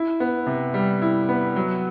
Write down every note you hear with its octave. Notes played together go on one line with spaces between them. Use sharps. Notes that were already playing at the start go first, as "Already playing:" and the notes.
Already playing: E4
B3
C3
G3
E4
B3
F#3